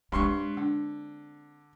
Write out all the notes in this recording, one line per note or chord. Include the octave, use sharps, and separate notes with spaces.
G2 G#3 C4 C6 C#6
D3